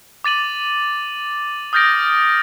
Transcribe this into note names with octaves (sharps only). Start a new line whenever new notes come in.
D6 A6 D#7 F#7
D#6 F6 G6 A6 A#6 D7